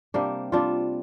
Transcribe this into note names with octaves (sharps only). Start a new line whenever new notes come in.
C3 G3 A#3 D4
C3 G3 D4 F4